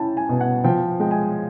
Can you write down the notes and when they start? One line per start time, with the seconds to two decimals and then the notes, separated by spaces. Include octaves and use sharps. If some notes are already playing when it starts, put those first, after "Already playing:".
Already playing: C#4 E4 G5 A5
0.17 G#5
0.29 B2
0.41 F#5
0.64 F3 G5
1.00 G#3 G5
1.11 G#5